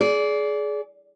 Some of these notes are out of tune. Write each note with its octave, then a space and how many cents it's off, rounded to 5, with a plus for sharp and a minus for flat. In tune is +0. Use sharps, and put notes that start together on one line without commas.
G#4 +20 D5 -25